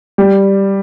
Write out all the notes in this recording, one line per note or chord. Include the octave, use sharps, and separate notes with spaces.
G3